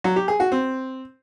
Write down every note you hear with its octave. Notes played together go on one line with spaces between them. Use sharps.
F#3
G4
G#4
F#4
C4